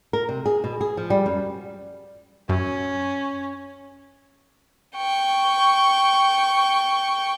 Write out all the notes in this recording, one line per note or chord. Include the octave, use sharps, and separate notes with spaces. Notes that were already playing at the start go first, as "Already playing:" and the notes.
A#4
C3
G#4
B2
G#4
F3
G3
F#2
F#2 C#4
G5 C#6